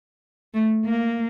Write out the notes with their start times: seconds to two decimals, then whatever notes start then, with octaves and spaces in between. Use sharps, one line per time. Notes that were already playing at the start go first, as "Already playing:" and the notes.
0.54 A3
0.85 A#3